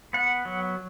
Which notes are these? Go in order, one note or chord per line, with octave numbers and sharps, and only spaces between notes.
B3 F#5
F#3